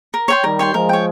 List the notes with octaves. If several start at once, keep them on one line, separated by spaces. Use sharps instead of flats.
A#4
C#5 G5 C6
D#3 G3 A#4
C#5 G5 C6
F3 G#3 A#4
C#5 G5